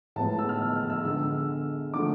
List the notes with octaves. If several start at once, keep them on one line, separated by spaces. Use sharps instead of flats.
A2 F3 G#3 B3 A5
E6
F6
F6
E6
D3 G#3 B3 E6
D3 F3 A3 D6